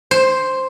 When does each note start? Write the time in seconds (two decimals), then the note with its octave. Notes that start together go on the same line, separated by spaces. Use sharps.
0.11 C5